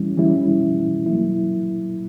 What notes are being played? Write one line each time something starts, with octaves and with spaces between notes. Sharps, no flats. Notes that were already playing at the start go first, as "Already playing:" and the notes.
Already playing: E3 G3 C#4 E4
E3 G3 C#4 E4
F#3 A#3 E4